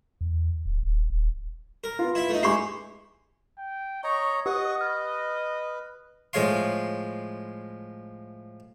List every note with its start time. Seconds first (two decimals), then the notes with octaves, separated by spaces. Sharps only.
0.21 E2
0.66 D1
0.83 D#1
1.10 D#1
1.84 A#4
1.99 B3 F4
2.15 E4 E5
2.29 A3 D#4
2.43 G#3 E4 G4 C#6 C7
3.58 G5
4.04 C#5 D#5 A#5 C#6
4.46 G4 D#5 F#5 C#6 D#6
4.81 B4 F6
6.33 A2 F3 G#3 C#5 F5 C6